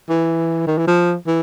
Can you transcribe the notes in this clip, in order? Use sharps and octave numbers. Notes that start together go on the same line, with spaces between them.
E3
D#3
E3
F3
E3